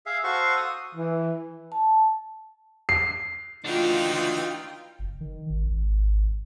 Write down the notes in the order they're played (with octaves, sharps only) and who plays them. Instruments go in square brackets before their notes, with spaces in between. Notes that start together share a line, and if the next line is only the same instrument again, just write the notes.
[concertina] G#4 E5 F5
F#4 A4 C5 F5 F#5 C#6
D#6
[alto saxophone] E3
[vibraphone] A5
[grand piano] C7
[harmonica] E3 D#4 [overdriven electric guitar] D4 F#4 [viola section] F4 G5
[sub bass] F#1
D#3
G#1
G#1